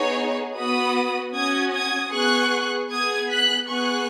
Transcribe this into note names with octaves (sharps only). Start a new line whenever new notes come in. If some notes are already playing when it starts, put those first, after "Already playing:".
Already playing: B3 D#4 G#4 C#5
B3 F#4 B5 D#6
C#4 F#4 D#6 G#6
D#6 G#6
B3 G#4 C#6 F#6
B3 G#4 D#6 G#6
F#6 B6
B3 G#4 C#6 F#6